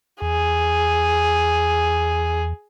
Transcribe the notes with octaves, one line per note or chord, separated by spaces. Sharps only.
E2 G#4